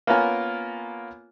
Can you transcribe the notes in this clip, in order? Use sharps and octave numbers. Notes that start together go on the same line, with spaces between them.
A#3 B3 C#4 F4 A#4 G#5